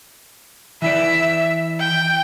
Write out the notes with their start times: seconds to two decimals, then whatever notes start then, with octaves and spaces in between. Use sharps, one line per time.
0.82 E3 E4 D5 E5
1.79 G5